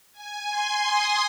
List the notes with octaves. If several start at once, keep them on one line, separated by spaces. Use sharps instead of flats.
G#5
C6
D#6